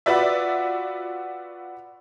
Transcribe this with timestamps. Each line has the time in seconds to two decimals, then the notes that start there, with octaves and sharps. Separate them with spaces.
0.06 F4 F#4 B4 D5 E5